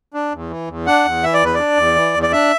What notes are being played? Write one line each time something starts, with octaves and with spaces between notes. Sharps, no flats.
D4
E2
E3
E2
D4 F#5
E2
E3 E5
D5
E2 B4
D4 D5
E2
E3
E2
D5
D4 E5